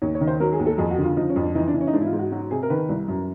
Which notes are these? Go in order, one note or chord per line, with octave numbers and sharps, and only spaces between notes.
D#2 C#5
C#5
D#3
C5
F#3 A#4
G#4
D#2
A4
F2 G#4
F#4
D3
F4
F3 D#4
C#4
F2
D4
E3 D#4
D4
E3
C#4
D#4
G#2 D4
E4
F4
G#2
F#4
F#3 F#4
C3 G#4
A#4
D#3 B4
C2
F#2